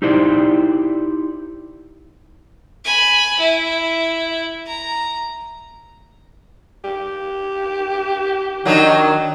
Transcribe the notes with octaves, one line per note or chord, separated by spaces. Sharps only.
D#4 E4 G4 C5 D5
G#5 B5
E4
A#5
G4
D#3 F#3 D4 D#4